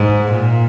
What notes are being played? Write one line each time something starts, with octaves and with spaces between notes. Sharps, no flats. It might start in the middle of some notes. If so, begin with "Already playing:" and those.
Already playing: G#2
A#2